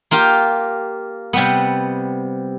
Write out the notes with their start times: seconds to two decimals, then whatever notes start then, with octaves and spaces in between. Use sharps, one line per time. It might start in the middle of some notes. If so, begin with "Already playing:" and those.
0.11 A#3 F4 G4
1.33 C3 G3 B3